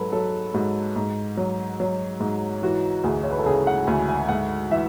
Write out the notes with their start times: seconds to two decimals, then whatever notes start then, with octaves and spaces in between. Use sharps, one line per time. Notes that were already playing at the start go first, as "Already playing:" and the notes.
Already playing: G#2 F#3 A4 B4
0.12 F#3 A4
0.54 G#2 F#4
0.96 G#2
1.37 F#3
1.80 F#3
2.20 G#2
2.62 E3 F#4
3.04 D2 G#4
3.23 C#5
3.30 B4
3.39 A4
3.46 C#3 G#4
3.67 F#5
3.87 D2 G#5
4.09 G#5
4.29 G#2 F#5
4.70 E3 E5